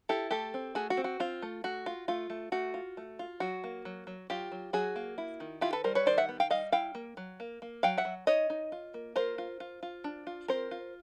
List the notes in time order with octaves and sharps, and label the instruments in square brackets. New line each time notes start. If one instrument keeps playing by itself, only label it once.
[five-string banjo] E4 G4 A4
A3 G4 A4
C4
A3 F#4 G#4
F#4
C4
F#4
C4 F4
A3
A3 F#4
F4
A3 F4
A3
A3 F#4
F4
A3
F4
F#3 F#4
A#3
F#3
F#3
F#3 F4 G4
F#3
F#3 F#4 G#4
A#3
E4
D#3
E4 F4 G4
A4 B4
G3 A#4 C5
B4 C#5
D#3 C5 D5
E5 F#5
B3
F5 G5
G3 D#5 F5
E4 F5 G5
A#3
F#3
A#3
A#3
F#3 F5 G5
E5 F#5
F#3
D#4 C#5 D#5
D#4
F4
A#3
F4 A#4 C5
F4
F4
F4
D4
F4
C4 A#4 C5
F4